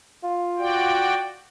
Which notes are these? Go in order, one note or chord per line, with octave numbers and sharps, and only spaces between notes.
F4
F#4 D5 G5